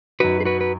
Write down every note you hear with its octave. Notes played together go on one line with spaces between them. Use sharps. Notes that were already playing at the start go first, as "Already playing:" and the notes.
F#2 F#3 D#4 F#4 B4
G#4
F#4 B4
B4